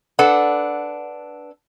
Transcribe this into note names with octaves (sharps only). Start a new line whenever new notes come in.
D4 A4 B4 F#5